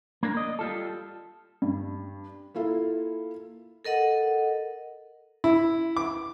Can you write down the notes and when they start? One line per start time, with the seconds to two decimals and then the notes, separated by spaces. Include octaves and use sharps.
0.23 A#3 D4 A#4
0.37 D5 D#5
0.59 G3 F4 A4
1.62 G2
2.55 A#3 E4 F4 A4
3.85 A4 A#4 D#5 F#5
5.44 E4
5.97 D6